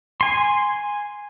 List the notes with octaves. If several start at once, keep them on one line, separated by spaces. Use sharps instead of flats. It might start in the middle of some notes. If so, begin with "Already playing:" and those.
G#5 C6